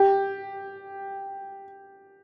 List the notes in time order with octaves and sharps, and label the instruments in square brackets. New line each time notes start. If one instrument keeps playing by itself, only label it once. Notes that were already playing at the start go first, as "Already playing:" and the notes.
Already playing: [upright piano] G4